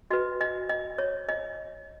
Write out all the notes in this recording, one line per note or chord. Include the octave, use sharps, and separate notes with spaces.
F#4 B4 D#5
D#5
D#5
C#5
D#5